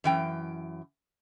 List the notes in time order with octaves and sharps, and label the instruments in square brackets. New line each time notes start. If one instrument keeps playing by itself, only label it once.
[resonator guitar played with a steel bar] F#2 E3 G5